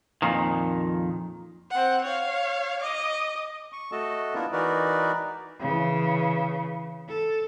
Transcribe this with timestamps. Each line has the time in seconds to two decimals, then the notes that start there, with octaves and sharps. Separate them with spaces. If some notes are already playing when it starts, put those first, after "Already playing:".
0.22 F2 A#2 D#3
1.70 C4 F#5
2.04 C#5 F5
2.80 D#5 D6
3.72 C#6
3.92 A3 F#4 A4 D#5 A5
4.34 A#3 B3 D4 E4 F4 A#4
4.52 E3 D#4 F#4 A#4 B4 D5
5.60 C#3 E3
7.08 A4